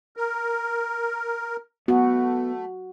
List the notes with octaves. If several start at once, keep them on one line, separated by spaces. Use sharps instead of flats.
A#4
A3 B3 F#4